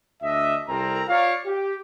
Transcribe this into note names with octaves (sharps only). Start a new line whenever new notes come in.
D2 D4 D#5 E5
C2 C4 A4 A#4 A#5
F4 C#5 D5 F5
G4